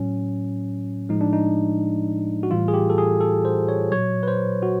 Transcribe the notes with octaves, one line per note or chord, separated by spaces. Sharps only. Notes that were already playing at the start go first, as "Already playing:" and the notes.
Already playing: A2 F#3 C#4
A2 F3 G#3 D#4
D4
D#4
F#4
A2 E3 G3 F4
G#4
G4
A4
G#4
A4
C5
C#5
A#2 F#3 C#5
B4
C5
F#4